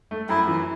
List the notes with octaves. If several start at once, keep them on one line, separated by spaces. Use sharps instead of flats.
A3
F#2 E4
E3